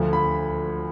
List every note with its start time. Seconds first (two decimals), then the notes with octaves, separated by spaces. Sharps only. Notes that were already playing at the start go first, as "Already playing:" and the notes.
Already playing: D2 D3 F3
0.13 B5